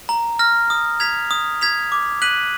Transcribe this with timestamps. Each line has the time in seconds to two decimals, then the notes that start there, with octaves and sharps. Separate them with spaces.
0.09 A#5
0.39 F6 A#6
0.70 D#6
1.00 G#6 B6 F7
1.31 D#6
1.61 G#6 B6 F7
1.92 D6
2.22 F#6 B6 D#7 F#7